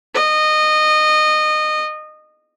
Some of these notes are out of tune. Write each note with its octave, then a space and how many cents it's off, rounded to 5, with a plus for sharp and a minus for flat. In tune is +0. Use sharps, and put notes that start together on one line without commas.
D#5 -20